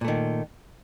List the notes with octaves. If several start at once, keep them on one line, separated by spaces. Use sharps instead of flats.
A#2 D#3 A3